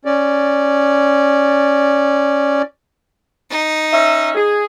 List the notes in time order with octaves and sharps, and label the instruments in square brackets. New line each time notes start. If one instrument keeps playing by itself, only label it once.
[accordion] C#4 D5
[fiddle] D#4
[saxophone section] C#4 E5
G#4